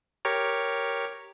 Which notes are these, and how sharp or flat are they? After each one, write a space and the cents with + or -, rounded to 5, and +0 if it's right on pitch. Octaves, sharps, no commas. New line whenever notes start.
G4 +0 A#4 +0 C#5 +0